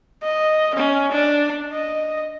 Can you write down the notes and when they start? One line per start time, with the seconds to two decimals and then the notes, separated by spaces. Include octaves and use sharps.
0.24 D#5
0.75 C#4
1.12 D4
1.73 D#5